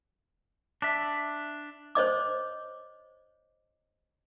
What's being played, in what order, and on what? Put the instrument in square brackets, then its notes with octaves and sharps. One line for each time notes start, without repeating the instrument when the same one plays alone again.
[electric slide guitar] D4 E5
[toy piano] C5 C#5 D#5 D6